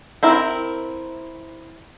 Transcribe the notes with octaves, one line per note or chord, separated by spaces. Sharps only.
C4 E4 A#4